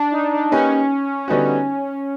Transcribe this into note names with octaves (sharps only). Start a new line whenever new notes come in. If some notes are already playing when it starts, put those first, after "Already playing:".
Already playing: D4
D#4
D4
A#3 C#4 D#4 G4 B4
D3 G3 B3 C#4 D#4 F#4